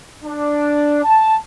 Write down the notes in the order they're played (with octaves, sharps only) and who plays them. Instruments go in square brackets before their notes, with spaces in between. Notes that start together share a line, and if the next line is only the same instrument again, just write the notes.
[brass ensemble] D4
A5